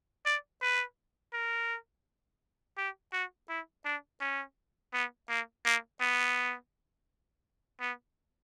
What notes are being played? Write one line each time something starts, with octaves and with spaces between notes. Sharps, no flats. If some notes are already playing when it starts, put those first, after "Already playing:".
D5
B4
A#4
G4
F#4
E4
D4
C#4
B3
A#3
A#3
B3
B3